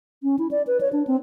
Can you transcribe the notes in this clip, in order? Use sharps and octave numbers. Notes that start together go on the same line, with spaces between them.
C#4
E4
D5
B4
C#5
D4
C4